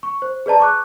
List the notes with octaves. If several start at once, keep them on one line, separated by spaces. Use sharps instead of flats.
C#6
C5
G#4 B4 D5 A5 A#5
C#6 D6 F#6